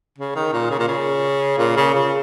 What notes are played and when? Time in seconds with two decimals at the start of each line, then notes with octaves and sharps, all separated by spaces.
0.18 C#3
0.35 D#3
0.53 A#2
0.71 C#3
0.80 A#2
0.88 C#3
1.58 A#2
1.76 C#3
1.94 C#3